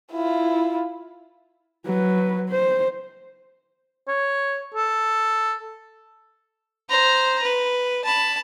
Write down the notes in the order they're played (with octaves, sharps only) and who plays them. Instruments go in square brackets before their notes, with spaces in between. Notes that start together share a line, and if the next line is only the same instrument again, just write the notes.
[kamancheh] E4 F4
[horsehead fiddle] F#3 B4
C5
[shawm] C#5
A4
[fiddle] C5 A#5
B4
A5 B5